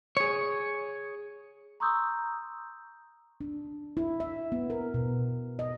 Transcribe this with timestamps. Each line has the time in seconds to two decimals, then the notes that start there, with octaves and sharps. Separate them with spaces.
0.17 G#4 C#5
1.80 A#5 C6 C#6 D#6 E6 G6
3.41 D4
3.97 E4
4.20 E5
4.52 B3
4.70 A#4
4.94 B2
5.59 D#5